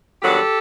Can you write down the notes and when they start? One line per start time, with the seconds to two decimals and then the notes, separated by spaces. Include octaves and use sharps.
0.21 G2 D#3 F#3 B3 D4 G4 A4